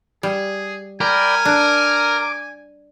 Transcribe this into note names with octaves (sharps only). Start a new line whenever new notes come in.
G3 G#4
A#4 D5 G5 G#5 B5
D4 D6